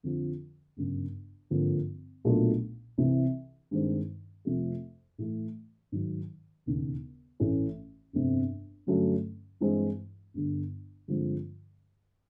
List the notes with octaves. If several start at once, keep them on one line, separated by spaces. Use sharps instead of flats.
F2 D3 F3
G1 F#2 C#3
G#1 G2 D3 F3 A#3
B1 A#2 F#3 A3 D4
C2 C3 E3
G2 D#3 G#3 C4
F2 C3 F3 A3
A2 E3 A3
G#2 D#3 F#3
E1 D#2 C#3
A1 A2 E3 A3 C#4
G1 F2 C3
G2 D3 F#3 A3 C#4
G2 E3 G#3 C4 E4
G1 G2 D3
G2 D3 F3 G#3 C4